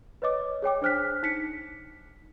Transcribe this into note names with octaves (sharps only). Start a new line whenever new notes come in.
B4 C#5 D#5 D6
G#4 C#5 G5 D6
D4 C5 F6 F#6 B6
D#4 B6 C#7